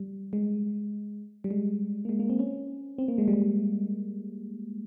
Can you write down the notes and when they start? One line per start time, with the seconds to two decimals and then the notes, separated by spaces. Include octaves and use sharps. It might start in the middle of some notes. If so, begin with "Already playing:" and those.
Already playing: G3
0.33 G#3
1.44 G3
1.51 G#3
2.05 A#3
2.09 G#3
2.20 A#3
2.30 C4
2.39 C#4
2.98 C4
3.08 A#3
3.18 G#3
3.28 G3